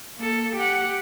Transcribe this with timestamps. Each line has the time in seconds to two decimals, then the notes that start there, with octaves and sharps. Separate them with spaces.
0.17 A#3 A4
0.55 G4 F#5